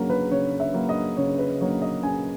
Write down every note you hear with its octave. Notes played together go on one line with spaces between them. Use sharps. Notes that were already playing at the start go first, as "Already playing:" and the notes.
Already playing: C#3 F#3 A#3 A#4
B4
C#3 C#5
E5
F#3 A#3
D#5
C#3 C#5
B4
F#3 A#3 C#5
D#5
C#3 G#5